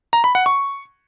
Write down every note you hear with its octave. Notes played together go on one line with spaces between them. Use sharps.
A#5
B5
F#5
C#6